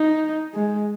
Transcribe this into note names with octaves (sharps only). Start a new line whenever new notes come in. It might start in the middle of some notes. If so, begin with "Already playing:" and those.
Already playing: D#4
G#3